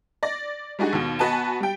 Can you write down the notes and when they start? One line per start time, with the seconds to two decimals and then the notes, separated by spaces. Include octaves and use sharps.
0.23 D5 A#6
0.79 G3 G#3 D4 D#4 F#4 G#4
0.93 D#2 B2
1.19 B3 F#4 B4 D#5 G#5 A5
1.60 G3 G5